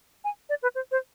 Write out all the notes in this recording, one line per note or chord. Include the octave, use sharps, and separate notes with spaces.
G#5
D5
B4
C5
C5